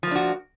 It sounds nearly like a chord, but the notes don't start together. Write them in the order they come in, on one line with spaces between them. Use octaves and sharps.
F3 A#3 D4 F#4